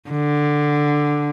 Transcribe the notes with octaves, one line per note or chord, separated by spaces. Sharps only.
D3